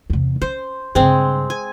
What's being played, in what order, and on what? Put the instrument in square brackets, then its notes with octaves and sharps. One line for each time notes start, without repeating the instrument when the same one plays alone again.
[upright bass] E2 C3
[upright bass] C#4 [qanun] C5
[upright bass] G2 C#3 [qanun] G#3 C4
[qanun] G#5